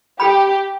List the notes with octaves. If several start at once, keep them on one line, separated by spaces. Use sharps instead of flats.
G4 A4 G5 B5